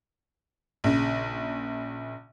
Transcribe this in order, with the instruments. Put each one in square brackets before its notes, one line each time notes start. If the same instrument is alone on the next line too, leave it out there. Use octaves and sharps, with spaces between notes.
[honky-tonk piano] A#1 C#3